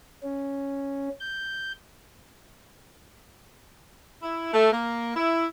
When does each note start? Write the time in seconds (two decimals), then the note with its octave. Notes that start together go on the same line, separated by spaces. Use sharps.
0.23 C#4
1.20 G6
4.23 E4
4.53 A3
4.72 A#3
5.16 E4